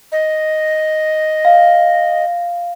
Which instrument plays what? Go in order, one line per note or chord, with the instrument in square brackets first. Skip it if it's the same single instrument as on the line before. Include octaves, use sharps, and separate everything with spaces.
[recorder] D#5
[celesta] F5